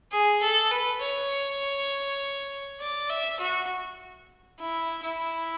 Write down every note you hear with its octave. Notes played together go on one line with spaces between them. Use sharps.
G#4
A4
B4
C#5
D5
E5
F#4
E4
E4